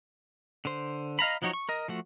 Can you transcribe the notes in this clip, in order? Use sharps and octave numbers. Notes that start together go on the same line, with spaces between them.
D3 C5
D#5 F5 A#5 B5
F3 F#3 D#4 F#4 C#5
C#6
A#4 D#5
F3 A3 F#4